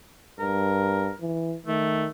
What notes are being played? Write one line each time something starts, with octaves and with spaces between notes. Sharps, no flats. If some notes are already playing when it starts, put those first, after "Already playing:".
G2 A#4
E3
D#3 A3